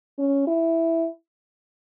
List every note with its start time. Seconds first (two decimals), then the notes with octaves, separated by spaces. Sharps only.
0.19 C#4
0.47 E4